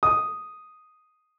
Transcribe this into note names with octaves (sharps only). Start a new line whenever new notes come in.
D#6